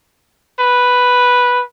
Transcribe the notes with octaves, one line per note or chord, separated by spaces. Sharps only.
B4